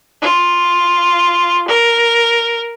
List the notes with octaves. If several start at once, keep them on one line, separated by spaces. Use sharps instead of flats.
F4
A#4